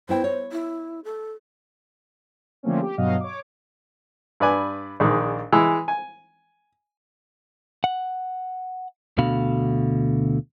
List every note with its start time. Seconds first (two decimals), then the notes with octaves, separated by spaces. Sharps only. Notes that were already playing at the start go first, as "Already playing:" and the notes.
0.09 B3 E4 C5 G5
0.24 C#5
0.52 E4
1.04 A4
2.63 D3 F3 A3 A#3 C4 C#4
2.81 G4
2.97 G2 B2 F#3 F#4 D#5 F5
3.20 C#5 D6
4.40 G2 B4 D5 G#5
5.00 A#1 D#3 G#3 D5
5.53 E3 G#3 E4
5.88 G#5
7.84 F#5
9.18 D2 B2 D3 F#4 F5 B5